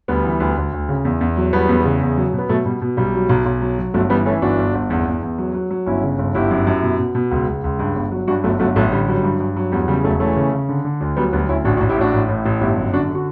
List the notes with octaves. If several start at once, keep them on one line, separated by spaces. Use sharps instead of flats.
D2 G3 B3
E3
D2
D2
D2
C#3
E2
E2
F#3
E2 G3 B3
E2
C#3
E2
F#3
B2
B3
B2 F#3 A3
B2 G3
B2
B1 G3
F#3
B1
B1
F#3
F#3
G1 F#3 A3
E3 G3 B3
E3 A3 C#4
G1 D4 F#4
G1
G1
E2
E2
E2
F#3
F#3
F#3
G1 C#4 E4
C#3
G1
G1 E4 G4
F#2
F#2
B2
B2
B2
C#2
C#2
C#2
G2
G1
F#3
G2 D4 F#4
G1 F#3 A3
G1 F#3 A3
A1 F#3 A3
D3 G3
F#3 G3
G2
G2
F#3
E2 G3
C#3 G3
E1 F#3 A3
E3 A3 C#4
C#3
C#3
D3
D3
D2
F#3 G3 B3
D2 G3 B3
D2 C#4 E4
A1 D4 F#4
D4 F#4
A1
E4 G4
A2 D4 F#4
A1
A2
A1
G1 E4 G4
F#2
D3 D4 F#4
D3
F#4